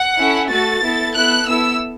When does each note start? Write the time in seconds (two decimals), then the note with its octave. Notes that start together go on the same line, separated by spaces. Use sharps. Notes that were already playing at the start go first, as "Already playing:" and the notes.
Already playing: F#5
0.18 C#4 E4 A4
0.50 A3 F#4 A4 A6
0.83 B3 E4 A4
1.15 B3 E4 A4 F#6
1.47 B3 E4 A4 E6